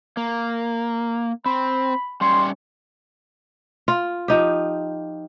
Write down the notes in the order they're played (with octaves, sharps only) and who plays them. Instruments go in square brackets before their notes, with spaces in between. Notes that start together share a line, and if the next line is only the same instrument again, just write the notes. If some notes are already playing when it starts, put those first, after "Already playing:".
[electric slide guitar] A#3
[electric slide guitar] C4 [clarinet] B5
[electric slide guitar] G3 C#4 C#5 [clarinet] C6
[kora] F4
F3 D#4 G4